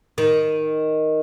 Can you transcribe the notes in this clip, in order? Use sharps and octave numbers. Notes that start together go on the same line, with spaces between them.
D#3